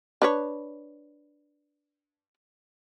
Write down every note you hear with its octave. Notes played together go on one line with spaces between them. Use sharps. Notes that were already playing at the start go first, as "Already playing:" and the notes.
D4 B4 C#5